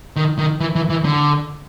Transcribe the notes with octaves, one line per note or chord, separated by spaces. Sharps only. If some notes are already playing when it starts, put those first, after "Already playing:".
D#3
D#3
E3
E3
E3
D3